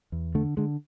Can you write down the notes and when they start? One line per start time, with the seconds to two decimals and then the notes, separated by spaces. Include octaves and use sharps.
0.12 E2
0.35 D3 A3
0.57 D3 G#3